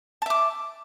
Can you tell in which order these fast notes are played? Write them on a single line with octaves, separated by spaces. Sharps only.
A5 E5 D6